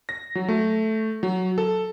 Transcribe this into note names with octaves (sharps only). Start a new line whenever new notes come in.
A#6
F#3
A3
F#3
A4